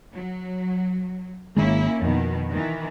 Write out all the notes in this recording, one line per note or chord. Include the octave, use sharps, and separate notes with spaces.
F#3
G#1 D#3 G#3 A#3 C#4 E4
F2 B2 D#3
D#3 E3